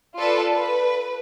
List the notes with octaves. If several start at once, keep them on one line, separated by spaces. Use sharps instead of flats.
F4 A4 B4 D5
B4